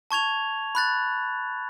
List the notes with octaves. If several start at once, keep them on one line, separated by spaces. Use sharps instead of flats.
A5 C#6 G#6 F7
B5 F#6 A6